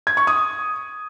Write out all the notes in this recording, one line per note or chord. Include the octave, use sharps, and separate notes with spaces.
G#6
C#6
D#6